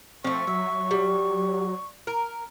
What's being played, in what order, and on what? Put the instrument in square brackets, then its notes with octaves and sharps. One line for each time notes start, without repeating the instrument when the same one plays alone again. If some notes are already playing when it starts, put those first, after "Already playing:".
[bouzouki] F3 A3 [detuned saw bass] C4 [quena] C#6
[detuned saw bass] F#3 [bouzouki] E5
[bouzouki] G3
A#4